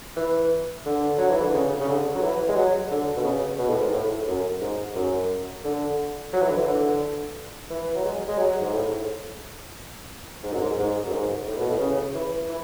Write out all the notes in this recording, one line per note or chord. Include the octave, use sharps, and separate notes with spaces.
E3
D3
F#3
E3
D3
C#3
C#3
D3
F#3
E3
G#3
F#3
D3
B2
C#3
B2
A2
G#2
A2
F#2
G#2
F#2
D3
F#3
E3
D3
E3
D3
E3
F#3
G#3
G#3
F#3
G#2
A2
G#2
F#2
G#2
G#2
F#2
G#2
A2
B2
A2
C#3
E3
E3